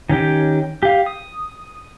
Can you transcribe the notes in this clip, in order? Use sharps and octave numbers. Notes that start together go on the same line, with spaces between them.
D#3 C#4 G4 G5
G4 F5
D#6